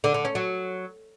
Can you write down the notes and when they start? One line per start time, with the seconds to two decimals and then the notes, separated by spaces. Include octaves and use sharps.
0.04 D3
0.14 D3
0.25 C#4
0.35 F#3